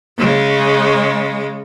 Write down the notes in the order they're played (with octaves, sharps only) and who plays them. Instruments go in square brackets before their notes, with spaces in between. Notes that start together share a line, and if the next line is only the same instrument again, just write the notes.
[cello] C#3 G#3